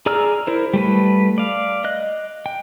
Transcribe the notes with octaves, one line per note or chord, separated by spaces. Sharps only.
G#4 D5 A#5 E6 F6
E4 A#4 C5
G3 A3 B4
D5 F5
D#5 F#6
G5